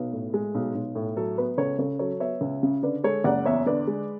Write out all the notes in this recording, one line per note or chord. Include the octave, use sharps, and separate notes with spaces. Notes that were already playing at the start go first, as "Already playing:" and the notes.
Already playing: B1 B4
A2
G#3
B1
B1
A2
F#3 A4
B3 B4
C#2 A4 C#5
C#3 A4 C#5
F#3 A4 C#5
B3 C#5 E5
C#2
C#3
D3 B4 D5
G#3 A4 C#5
F#1 D5 F#5
E2 C#5 E5
D3 B4 D5
G#3